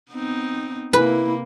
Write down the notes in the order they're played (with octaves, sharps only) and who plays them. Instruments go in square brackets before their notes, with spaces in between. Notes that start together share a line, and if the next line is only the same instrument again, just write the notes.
[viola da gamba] B3 C4 D#4
[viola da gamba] C3 A#3 [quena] E4 [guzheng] B4